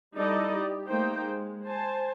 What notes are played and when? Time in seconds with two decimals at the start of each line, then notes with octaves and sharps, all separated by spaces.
0.15 G3 D#4 E4 A4 D5 D#5
0.57 G4
0.87 A3 A#3 D#4 C5 G5
1.22 G#3
1.64 C5 G#5 A5